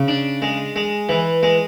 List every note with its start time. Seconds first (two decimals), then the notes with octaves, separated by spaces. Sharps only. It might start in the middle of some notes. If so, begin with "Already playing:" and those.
Already playing: C#3
0.08 D4
0.42 G#3
0.76 G#3
1.09 E3
1.43 G#3